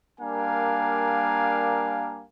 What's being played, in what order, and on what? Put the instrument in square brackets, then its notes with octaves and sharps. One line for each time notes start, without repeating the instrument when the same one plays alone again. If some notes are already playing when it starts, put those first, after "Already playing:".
[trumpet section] G3 A#3 D4 A#4 F5 G#5